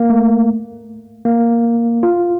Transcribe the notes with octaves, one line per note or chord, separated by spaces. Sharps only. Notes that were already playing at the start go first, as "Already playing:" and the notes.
Already playing: A#3
A3
A#3
F4